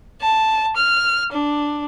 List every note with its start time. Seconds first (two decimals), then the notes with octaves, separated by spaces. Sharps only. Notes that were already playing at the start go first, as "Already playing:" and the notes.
0.20 A5
0.75 F6
1.31 D4